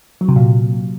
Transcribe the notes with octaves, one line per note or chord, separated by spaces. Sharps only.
F#3
C3
A#2